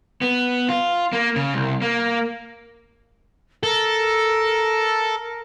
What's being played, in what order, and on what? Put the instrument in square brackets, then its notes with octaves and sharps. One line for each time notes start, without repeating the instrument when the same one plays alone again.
[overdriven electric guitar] B3
F4
A#3
C#3
C2
A#3
[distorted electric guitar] A4 [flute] A#4